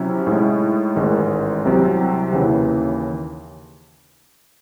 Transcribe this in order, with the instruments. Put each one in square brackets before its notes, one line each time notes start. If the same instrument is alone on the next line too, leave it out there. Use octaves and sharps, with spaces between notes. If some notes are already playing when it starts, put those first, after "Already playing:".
Already playing: [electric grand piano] C3 F#3 C#4 E4
A2 G#3 D#4
A1 G#2 D#3 G#3
C2 C3 F#3 C4
D#2 C#3 E3